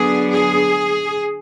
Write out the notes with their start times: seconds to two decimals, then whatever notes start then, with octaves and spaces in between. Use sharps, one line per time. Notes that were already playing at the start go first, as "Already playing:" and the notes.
Already playing: D3 F#3 B3 D4 G#4
0.30 G#4